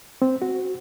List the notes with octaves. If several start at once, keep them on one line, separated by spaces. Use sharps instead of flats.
C4
F#4